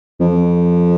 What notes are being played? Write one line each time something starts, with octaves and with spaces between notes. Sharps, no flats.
F2